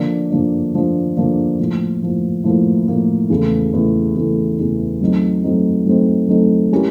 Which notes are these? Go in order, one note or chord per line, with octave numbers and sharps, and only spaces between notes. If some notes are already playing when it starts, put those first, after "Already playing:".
Already playing: D3 F3 A#3 D4
D3 F3 A#3 D4
D3 F3 A#3 D4
D3 F3 A#3 D4
A2 F3 A#3
A2 F3 A#3
A2 F3 A#3
A2 F3 A#3
E2 C#3 E3 A3
E2 C#3 E3 A3
E2 C#3 E3 A3
E2 C#3 E3 A3
F#3 A3 C4 D#4
F#3 A3 C4 D#4
F#3 A3 C4 D#4
F#3 A3 C4 D#4
G#3 C#4 E4 G4 A#4